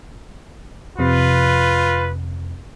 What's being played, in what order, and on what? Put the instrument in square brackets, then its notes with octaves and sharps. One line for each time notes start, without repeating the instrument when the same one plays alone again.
[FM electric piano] F2 C3 [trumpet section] F4 B4